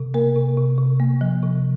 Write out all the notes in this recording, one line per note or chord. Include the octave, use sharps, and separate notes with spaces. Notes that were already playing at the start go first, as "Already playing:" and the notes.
Already playing: C3
A#3 A#4
C3
C3
C3
A#3
F3
C3